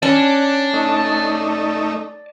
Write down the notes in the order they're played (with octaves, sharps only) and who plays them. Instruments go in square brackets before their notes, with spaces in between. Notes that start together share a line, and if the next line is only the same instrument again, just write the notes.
[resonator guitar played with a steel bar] C#4 [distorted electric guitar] D5 A5
[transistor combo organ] A3 D#4